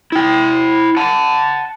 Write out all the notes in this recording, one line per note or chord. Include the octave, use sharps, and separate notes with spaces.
E4 G5
F#5 A5